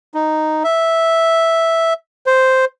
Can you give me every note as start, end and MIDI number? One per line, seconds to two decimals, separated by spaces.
0.14 0.63 63
0.64 1.93 76
2.26 2.65 72